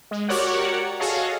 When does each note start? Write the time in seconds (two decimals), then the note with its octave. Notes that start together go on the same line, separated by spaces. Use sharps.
0.11 G#3
0.29 F#4 G4 A#4 C#5 D5 F#5
0.99 F#4 G#4 A4 C#5 D#5 F5